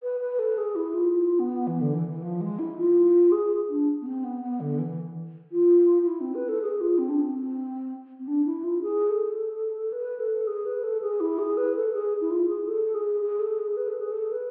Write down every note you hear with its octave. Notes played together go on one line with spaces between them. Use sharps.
B4
B4
A4
G#4
E4
F4
F4
B3
E3
D3
E3
E3
F3
G#3
E4
F4
G#4
D4
B3
C4
B3
B3
D3
E3
F4
F4
E4
C4
B4
A4
G#4
F4
C4
D4
C4
C4
D4
E4
F4
G#4
A4
B4
A4
G#4
B4
A4
G#4
E4
G#4
B4
A4
G#4
E4
F4
G#4
A4
G#4
G#4
A4
G#4
B4
A4
G#4
A4
B4